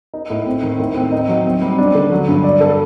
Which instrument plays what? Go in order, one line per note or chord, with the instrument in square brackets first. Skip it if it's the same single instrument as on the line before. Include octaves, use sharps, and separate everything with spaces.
[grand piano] D#4
A2
C4
D#3
A2
C4
D#4
F#3
C4
G3
D4
D3
F#3
G2
D5
A4